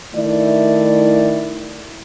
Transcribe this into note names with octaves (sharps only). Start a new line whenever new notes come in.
D#3 A3 E4 D5